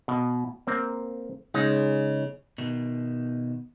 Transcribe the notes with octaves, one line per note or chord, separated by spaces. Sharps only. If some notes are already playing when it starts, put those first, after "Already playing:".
B2
A#3 C4
C#3 G#3 D#4
B2 D#3